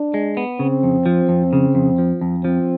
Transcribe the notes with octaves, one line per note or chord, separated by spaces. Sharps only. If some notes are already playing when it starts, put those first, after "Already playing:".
Already playing: D4
G#3
B3
C#3 C4
F2
F3
F2
C#3
F2
F3
F2
F3 C4